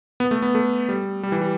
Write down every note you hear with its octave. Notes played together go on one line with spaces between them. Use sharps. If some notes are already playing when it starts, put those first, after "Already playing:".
B3
A3
B3
A3
G3
G3
E3
G3